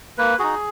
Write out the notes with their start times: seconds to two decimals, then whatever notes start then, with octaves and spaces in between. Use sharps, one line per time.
0.18 A#3 B4
0.39 D#4 F#4 G#4